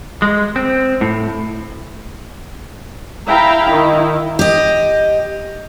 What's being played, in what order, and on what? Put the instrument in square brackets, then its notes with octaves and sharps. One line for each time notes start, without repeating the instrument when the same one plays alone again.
[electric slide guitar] G#3
C4
A2
[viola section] E4 E5 F5 G5 A#5 B5
D#3 E4
[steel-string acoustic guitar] G4 D#5